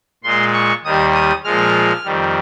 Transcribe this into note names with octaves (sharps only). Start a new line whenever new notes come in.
A#2 G#3 C6
C#6
D#2 D#3 G3 D#6
D#6
A#2 F3 G#3 F6
F2 D#3 G3